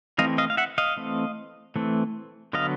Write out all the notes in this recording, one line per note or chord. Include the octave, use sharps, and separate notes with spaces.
E3 A3 C4 D#5 F5
D#5 F5
F5
E5 F#5
D#5 F5
E3 A3 C4
E3 A3 C4
D3 F#3 B3 D#5 F5